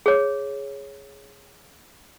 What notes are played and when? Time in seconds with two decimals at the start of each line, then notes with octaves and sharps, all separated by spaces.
0.06 G#4 C#5